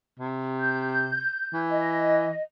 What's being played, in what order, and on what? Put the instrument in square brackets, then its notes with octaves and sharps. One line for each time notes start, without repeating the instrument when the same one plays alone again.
[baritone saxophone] C3
[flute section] G6
[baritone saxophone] E3
[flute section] D#5